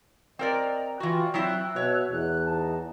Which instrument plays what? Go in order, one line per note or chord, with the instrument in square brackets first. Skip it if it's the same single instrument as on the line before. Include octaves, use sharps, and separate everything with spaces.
[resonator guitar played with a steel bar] C4 A#4 D5 [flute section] D#5 A#5
[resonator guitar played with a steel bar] E3 F#4 [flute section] F4 D5 G5
[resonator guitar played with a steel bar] F#3 C4 E4 [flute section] E5 E6 F#6
[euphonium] B2 [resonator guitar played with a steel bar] C#5
[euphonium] E2 [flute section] F#6
[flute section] D#4 A5